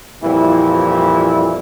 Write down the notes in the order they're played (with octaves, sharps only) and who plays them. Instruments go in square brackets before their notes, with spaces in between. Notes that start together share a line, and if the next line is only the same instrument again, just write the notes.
[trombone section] F2 A#2 E3 G3 E4